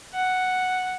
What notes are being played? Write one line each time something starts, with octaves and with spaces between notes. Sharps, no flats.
F#5